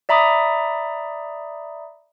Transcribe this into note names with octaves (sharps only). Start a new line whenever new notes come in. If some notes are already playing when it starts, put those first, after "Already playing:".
D5 E5 A#5 B5 D6 D#6